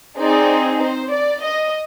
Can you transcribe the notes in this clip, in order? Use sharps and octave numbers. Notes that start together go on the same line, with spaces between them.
C4 D#4 G#4 D5
C5
D5
D#5